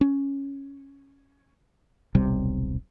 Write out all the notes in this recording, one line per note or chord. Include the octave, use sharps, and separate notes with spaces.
C#4
D#1 B1 C3 G3